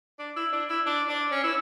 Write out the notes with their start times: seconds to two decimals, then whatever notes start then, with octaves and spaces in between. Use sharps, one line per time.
0.19 D4
0.36 E4
0.52 D4
0.69 E4
0.86 D4
1.09 D4
1.31 C#4
1.44 E4